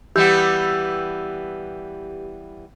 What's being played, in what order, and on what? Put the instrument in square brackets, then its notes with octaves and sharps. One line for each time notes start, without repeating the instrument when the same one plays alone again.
[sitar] E3 G3 B3 [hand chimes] G4 E6 G6